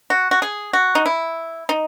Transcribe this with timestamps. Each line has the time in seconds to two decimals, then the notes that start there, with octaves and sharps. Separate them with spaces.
0.10 F#4
0.31 F#4
0.42 G#4
0.73 F#4
0.95 D#4
1.06 E4
1.69 D#4